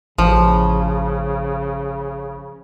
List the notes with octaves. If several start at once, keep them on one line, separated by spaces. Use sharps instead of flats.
A1 C#3 F3